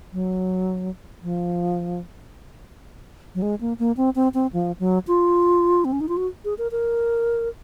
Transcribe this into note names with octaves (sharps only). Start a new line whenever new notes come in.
F#3
F3
F#3
G#3
A#3
A#3
C4
C4
C4
F3
F#3
F4
C4
C#4
D#4
F4
F#4
G#4
A#4
A#4